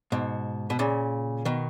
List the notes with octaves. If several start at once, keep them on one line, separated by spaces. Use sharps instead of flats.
G#2 B2
B2
A#2 C#3
B2 D#3